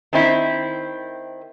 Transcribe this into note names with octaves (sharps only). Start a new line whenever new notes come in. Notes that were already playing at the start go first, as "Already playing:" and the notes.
D#3 C4 E4